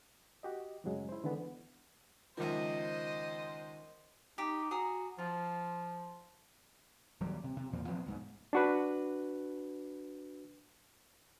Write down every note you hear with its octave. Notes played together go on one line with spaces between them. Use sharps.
F#4 G4 D#5
F#2 A2 C#3 F#3 G#3
E4 C5
D3 E3 G#3 B3
C#2 D#3 F3 C5 D#5 E5
D#4 G4
F#4 G#4 A#5 D#6
F3 F4
D#1 F#3 G3
C3
C3
E2 A#2 E3 F3
F3 B3 C4
C2 G#2
D4 F#4 B4